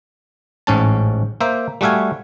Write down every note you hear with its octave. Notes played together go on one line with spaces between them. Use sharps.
A1 G#2 C#4 A5
A#3 C5 E5
G3 A3 F#4 E5 F5 G#5